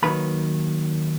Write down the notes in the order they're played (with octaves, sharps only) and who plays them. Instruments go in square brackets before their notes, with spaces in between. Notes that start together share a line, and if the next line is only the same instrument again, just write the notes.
[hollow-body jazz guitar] D#2 D#3 F#3 B4 B5